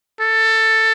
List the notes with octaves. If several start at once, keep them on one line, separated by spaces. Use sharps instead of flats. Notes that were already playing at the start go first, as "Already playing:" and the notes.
A4